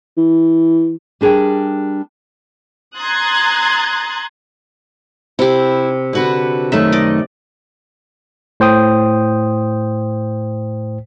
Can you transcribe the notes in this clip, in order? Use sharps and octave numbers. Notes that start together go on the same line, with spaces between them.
E3
G3 D4 G#4 A#4 G5
A#5 C6 D#6 F#6 G#6 A6
C3 E4 G4
D3 F#4 B4
F#2 D#3 A3 E5
D5 D#5
A2 C5 G5 D#6